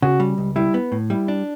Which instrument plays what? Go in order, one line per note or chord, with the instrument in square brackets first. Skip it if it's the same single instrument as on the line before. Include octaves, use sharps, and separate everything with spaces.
[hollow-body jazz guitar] C#3 [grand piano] F#4
[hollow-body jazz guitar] G3
C#2
[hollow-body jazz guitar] G3 [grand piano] E4
[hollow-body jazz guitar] B3
A2
[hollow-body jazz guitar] G3 [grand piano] E4
[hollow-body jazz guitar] D4